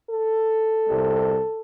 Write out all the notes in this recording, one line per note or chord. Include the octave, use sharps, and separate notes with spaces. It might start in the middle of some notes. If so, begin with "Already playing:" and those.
A4
C2 C3 G3